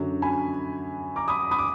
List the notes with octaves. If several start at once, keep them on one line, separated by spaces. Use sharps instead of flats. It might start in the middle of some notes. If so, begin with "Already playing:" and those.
Already playing: F#2 D3 F#3
G#5 B5
A#5 D6
B5 D#6
B5 D#6
D6